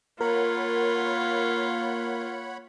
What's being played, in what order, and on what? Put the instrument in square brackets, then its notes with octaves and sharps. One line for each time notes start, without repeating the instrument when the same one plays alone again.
[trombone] A#3 [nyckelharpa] F4 [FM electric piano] A#4 [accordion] C#5 F#5 B5